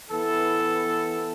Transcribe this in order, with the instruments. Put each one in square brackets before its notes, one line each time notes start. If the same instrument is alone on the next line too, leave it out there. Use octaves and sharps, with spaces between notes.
[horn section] E3 B3 E4 A4